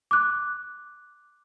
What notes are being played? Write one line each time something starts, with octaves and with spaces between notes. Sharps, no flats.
D6 F#6